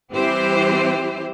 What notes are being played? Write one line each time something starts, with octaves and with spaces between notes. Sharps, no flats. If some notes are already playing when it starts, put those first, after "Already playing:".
E3 G3 C4 E4 G4 C5